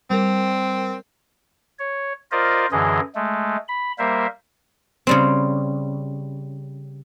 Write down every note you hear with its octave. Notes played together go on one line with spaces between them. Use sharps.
G3 C4 A#4
C#5
F4 A#4 C5 D5 D#5
F#2 D3 E3 G#4 D#5
G#3 A3
B5
G3 A#3 A#4 C5 E5
C#3 G3 C4